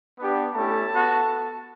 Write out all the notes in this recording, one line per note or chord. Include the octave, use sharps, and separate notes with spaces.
B3 D4 G4
A3 C#4 E4 G4 A4 A5
B3 F#4